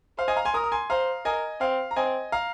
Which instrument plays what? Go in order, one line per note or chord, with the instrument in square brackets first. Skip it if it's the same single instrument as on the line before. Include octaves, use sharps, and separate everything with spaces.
[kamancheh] C5 [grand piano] F5
[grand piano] D#5 G#5
F5 A#5
G#5 C6
[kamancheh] A#4 [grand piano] A#5 D#6
[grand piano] D#6
G#5 C6
[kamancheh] C5 [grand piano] F5 A#5
[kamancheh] A#4 [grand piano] D#5 G#5
[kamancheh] C4 [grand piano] F5
[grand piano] A#5
[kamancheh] C4 [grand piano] D#5 G#5
[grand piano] F5 A#5